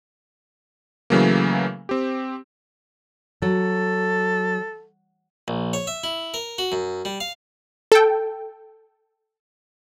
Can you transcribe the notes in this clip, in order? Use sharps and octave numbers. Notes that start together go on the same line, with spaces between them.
C#3 E3 F#3 A3 A#3
C4 G4
F#3 A4
A#1
C#5
E5
E4
A#4
F#4
F#2
G3
F5
A4 G5